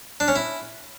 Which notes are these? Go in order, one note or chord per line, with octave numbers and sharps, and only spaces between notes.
D4
C#4
E4